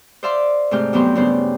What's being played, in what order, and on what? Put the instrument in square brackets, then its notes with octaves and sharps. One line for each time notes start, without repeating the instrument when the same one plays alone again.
[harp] C5 D5 E5 F5 C6 D6
G#2 C3 A3 G5 F6
F2 F#3 B3 G4 G5 C6
G2 C#3 B3 G4 C5 C6